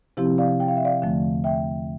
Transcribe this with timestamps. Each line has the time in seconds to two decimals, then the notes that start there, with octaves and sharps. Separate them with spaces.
0.17 C3 F3 C4 E4 G4
0.38 D5 F5
0.60 G5
0.68 F5
0.77 E5
0.85 D5 F5
1.02 E2 D3 F3 A3
1.44 E5 G5